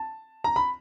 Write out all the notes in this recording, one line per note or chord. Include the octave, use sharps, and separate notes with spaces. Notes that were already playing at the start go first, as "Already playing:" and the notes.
Already playing: A5
A#5
B5